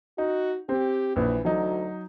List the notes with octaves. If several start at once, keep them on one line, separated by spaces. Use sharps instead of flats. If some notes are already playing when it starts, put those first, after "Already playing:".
D#4 F#4
C4 G4
A#1 E3 B4
D2 F#3 D#4